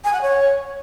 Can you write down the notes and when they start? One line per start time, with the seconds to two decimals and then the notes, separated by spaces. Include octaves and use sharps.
0.04 G#5
0.13 F#5
0.22 C#5